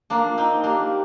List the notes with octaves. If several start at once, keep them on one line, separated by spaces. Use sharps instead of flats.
A#3 D4
F4
C4 D#4
A#3 D4 G4